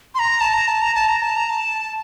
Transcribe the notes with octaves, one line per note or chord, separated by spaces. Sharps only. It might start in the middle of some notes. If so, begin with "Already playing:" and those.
C6
A#5
A5
A#5
A5
A#5
A5
A#5
A5
A#5
A5